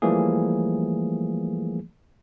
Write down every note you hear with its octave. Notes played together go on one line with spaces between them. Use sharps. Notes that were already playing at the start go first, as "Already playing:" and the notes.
E3 F3 G3 A3 A#3 G#4